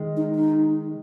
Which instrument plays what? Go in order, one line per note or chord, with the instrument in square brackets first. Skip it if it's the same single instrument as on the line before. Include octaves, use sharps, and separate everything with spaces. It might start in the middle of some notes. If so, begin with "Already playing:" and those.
Already playing: [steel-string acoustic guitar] D#3 G#3
[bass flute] D#4
D#4